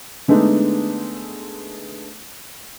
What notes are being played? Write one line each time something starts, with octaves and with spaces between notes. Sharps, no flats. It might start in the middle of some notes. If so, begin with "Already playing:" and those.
D3 G#3 A3 B3 D4 D#4